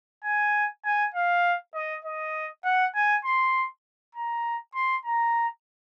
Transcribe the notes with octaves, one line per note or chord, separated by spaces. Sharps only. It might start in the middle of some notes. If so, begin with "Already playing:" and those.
G#5
G#5
F5
D#5
D#5
F#5
G#5
C6
A#5
C6
A#5